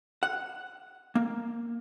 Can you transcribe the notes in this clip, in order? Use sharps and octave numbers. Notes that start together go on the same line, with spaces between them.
F#5
A#3